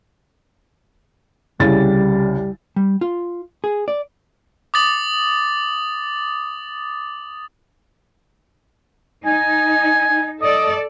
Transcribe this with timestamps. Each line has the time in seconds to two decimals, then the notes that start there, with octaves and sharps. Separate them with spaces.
1.60 C2 C#3 G3 A6
2.76 G3
3.01 F4
3.64 G#4
3.88 D5
4.74 D6 D#6 A6 F#7
9.26 D#4 G#5
10.41 A4 D5 D#5